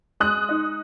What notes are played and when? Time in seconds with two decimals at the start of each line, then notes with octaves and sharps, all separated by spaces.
0.20 G#3 D#6 F#6
0.49 D#4